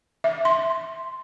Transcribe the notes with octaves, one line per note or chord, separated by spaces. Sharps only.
E5
C6